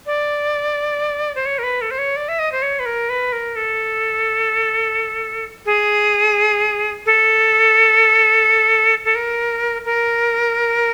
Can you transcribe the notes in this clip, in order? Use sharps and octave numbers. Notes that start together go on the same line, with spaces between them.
D5
C5
C#5
A#4
B4
A4
C5
C#5
D5
E5
D#5
C5
C#5
B4
A#4
B4
A#4
A4
G#4
A4
A4
A#4
A#4